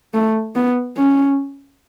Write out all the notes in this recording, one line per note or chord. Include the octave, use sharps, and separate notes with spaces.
A3
B3
C#4